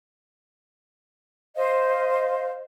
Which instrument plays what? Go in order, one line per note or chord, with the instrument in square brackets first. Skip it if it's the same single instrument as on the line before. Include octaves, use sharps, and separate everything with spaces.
[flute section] C5 D#5 F5